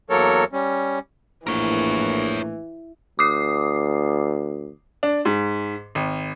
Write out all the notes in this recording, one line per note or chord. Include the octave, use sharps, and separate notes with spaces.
E2 F#3 A#3 A4 A#4 C#5
G3 C#4
A#1 A2 E3 A#4 C#5
D2 D6 D#6 C7
D4
G#2
G#1